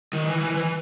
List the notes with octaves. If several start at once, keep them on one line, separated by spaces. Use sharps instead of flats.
D#3
E3
E3
E3